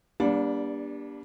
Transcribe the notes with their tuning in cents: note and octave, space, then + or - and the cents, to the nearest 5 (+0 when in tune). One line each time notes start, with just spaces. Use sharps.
G3 +10 A#3 +45 D4 -15